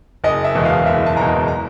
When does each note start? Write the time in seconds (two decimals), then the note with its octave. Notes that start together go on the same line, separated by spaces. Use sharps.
0.24 F#1 D#5
0.44 E5
0.55 E2 B2 G#3
0.65 F5
0.85 F#1 E5
1.06 A5
1.16 E2 B2 G#3 A#5
1.48 A#5